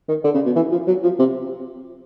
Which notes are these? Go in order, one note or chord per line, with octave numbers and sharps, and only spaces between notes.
D#3
D3
C#3
B2
E3
F3
F#3
F3
C3